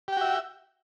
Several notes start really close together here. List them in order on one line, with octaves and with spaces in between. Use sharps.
G4 G5 F#4 E5